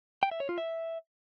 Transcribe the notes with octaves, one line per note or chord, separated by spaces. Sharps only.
G5
E5
C#5
F4
E5